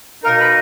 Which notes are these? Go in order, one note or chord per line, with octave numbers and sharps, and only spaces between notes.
B2 A#3 D#4 A#4
B4